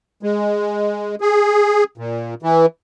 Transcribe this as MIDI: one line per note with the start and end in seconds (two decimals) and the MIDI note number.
0.23 1.15 56
1.21 1.84 68
1.98 2.34 46
2.43 2.66 52